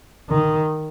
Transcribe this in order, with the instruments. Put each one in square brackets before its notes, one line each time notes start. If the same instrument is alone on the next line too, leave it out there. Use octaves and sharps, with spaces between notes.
[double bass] D#3